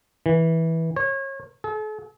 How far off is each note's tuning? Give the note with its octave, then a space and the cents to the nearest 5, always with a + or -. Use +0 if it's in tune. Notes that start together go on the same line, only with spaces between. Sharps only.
E3 -15
C#5 -30
A4 -45